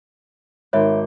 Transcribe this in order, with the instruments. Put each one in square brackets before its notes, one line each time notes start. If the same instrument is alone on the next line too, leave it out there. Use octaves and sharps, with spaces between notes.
[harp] G#1 D6 G6 [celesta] C#5 E5 B5